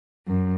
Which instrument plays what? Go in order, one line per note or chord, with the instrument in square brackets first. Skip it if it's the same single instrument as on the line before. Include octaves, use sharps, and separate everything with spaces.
[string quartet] F#2